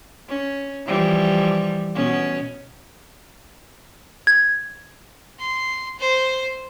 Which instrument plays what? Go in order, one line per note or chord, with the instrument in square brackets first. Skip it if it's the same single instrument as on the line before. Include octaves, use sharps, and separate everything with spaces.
[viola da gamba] C#4
E3 F3 G3
B2 B3 C#4
[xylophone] G#6
[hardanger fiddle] C6
C5